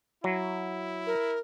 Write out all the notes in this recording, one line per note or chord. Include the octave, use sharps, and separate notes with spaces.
F#3 E4
A#4